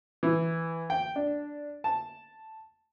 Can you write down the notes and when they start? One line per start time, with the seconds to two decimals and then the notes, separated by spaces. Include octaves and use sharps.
0.23 E3
0.90 G5
1.16 D4
1.84 A5